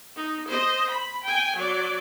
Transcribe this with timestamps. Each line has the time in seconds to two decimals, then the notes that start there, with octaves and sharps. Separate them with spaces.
0.16 D#4
0.48 C5 D#5
0.90 B5
1.24 G5 G#5
1.57 F#3 D5